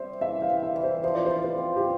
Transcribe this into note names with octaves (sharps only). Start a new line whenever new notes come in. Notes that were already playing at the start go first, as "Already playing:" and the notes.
Already playing: G3 C4 C5 E5
E3 E5
F5
G3
E5
E3
C5
F3 C5
D5
F4 C5
B4
C4
G4